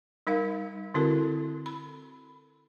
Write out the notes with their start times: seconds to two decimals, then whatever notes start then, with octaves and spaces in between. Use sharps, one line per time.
0.27 G3 D#4 A#4 F5
0.94 D3 C4 E4 F#4 A4 A#4
1.66 B5